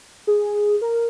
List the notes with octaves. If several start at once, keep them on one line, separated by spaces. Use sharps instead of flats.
G#4
A#4